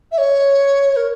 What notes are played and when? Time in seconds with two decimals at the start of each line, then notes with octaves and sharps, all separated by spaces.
0.12 E5
0.18 C#5
0.96 A#4